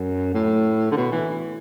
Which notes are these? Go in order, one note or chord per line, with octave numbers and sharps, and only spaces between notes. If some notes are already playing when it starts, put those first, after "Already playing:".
Already playing: F#2
A2
D3
B2
E3